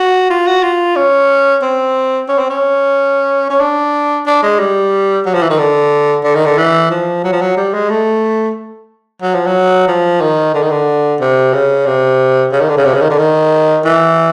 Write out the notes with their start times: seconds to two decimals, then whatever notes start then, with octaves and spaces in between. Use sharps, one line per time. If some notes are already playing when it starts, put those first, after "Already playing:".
Already playing: F#4
0.30 F4
0.47 F#4
0.63 F4
0.96 C#4
1.62 C4
2.29 C#4
2.39 C4
2.50 C#4
3.50 C#4
3.61 D4
4.26 D4
4.43 G#3
4.59 G3
5.26 F#3
5.34 F3
5.42 E3
5.50 D#3
5.59 D3
6.24 D3
6.35 D#3
6.46 D3
6.58 E3
6.91 F3
7.24 F#3
7.32 F3
7.41 F#3
7.57 G3
7.74 G#3
7.90 A3
9.22 F#3
9.35 F3
9.47 F#3
9.88 F3
10.21 D#3
10.54 D3
10.62 D#3
10.71 D3
11.20 C3
11.53 C#3
11.86 C3
12.52 C#3
12.61 D#3
12.69 D3
12.77 C#3
12.85 C3
12.94 C#3
13.02 D#3
13.10 D3
13.18 D#3
13.85 E3